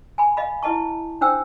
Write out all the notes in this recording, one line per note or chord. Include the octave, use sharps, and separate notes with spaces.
G#5 B5
D#5 F5 B5
E4 B4 D#5 A5 C#6
D4 B4 C5 G5 E6